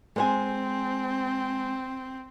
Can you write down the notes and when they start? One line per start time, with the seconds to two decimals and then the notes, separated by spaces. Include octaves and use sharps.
0.16 G#3 C4 C5 G#5